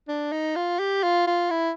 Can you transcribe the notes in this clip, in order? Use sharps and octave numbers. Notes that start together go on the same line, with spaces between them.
D4
D#4
F4
G4
F4
F4
E4